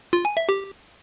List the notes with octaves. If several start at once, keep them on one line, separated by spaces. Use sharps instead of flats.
F4
G#5
E5
G4